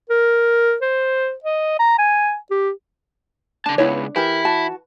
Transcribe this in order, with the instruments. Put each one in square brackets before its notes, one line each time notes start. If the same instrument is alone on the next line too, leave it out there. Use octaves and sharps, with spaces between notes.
[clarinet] A#4
C5
D#5
A#5
G#5
G4
[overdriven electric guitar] C#3 A5 [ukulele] D4
[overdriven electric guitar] C#2 [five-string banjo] B3 E4 C#5
[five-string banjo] E3 [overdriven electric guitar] E4 [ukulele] G4 A#4
[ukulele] F#4 A5